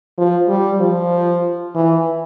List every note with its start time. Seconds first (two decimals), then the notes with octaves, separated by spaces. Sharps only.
0.18 F3
0.49 G3
0.80 F3
1.75 E3